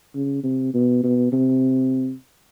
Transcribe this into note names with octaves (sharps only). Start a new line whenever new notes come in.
C#3
C3
B2
B2
C3